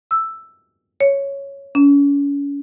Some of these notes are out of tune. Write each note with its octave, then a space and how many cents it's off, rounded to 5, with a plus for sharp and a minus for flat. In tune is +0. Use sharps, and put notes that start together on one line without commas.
E6 +5
C#5 +0
C#4 +35